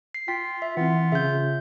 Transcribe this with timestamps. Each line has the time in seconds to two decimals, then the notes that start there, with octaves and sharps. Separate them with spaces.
0.15 C7
0.28 F4 G5 B6
0.62 E5
0.77 E3 C4 F4 F#5
1.12 C#3 E5 G6